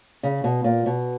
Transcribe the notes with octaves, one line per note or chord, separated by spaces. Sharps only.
C#3
B2
A#2
B2